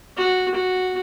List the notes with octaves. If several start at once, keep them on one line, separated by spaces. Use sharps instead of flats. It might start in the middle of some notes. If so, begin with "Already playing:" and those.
F#4
F#4